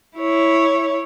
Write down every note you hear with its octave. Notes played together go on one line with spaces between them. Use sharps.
E4 C#5